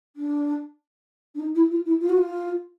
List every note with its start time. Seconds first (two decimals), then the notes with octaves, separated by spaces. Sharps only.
0.16 D4
1.34 D4
1.39 D#4
1.55 E4
1.70 F4
1.85 E4
2.01 F4
2.09 F#4
2.17 F4